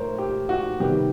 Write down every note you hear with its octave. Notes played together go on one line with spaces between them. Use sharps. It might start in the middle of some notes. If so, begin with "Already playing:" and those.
Already playing: A#2 A3 A#4 C5 C#5
G4
F#4
C3 D#3 G3 B3 G4